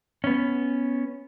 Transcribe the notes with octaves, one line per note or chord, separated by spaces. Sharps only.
B3 C#4